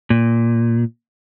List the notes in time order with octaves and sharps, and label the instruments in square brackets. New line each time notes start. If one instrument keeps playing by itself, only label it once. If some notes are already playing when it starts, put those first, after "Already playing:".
[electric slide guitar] A#2